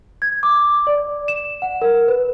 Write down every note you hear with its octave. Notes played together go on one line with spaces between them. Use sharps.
G#6
D6
D5
E7
F#5
A#4
B4